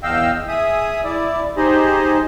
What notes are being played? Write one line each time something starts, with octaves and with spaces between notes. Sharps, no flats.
E2 D#5 F5 G5 E6
G#4 E5 D#6
E4 D5
D#4 G4 G#4 C5 D#5